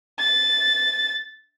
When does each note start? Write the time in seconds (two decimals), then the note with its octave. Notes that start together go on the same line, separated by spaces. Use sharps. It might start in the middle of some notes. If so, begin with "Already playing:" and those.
0.19 A6